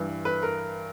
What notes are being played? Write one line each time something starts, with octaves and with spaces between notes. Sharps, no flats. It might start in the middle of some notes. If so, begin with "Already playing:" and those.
Already playing: G2 E3
B4
A#4